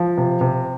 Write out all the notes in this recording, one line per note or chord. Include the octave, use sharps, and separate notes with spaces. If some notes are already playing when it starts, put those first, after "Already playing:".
Already playing: F3
C3
C3